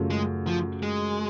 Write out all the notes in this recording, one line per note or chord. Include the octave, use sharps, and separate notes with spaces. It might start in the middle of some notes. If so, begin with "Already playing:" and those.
Already playing: F#2 C#3 F#3 A3 F4
G#3
F3
G#3